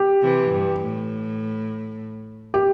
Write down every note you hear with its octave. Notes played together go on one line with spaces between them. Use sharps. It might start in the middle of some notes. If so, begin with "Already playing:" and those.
Already playing: G4
C3 E3
G2
A2
G4